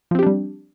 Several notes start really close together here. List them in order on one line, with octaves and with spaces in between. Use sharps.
F3 C4 G4 D4 G3